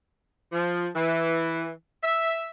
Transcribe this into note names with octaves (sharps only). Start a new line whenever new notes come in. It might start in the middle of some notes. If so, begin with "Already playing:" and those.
F3
E3
E5